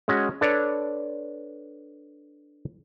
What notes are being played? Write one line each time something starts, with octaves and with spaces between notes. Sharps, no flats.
G#3 C#4 F#4
D4 A4 B4 C#5 D5